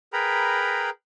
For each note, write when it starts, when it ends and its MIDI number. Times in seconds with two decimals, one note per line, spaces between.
0.13 0.90 68
0.13 0.90 70
0.13 0.90 71
0.13 0.90 79
0.13 0.90 82
0.13 0.90 83